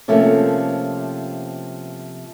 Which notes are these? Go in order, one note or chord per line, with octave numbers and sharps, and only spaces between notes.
C3 F3 A3 A#3 C#4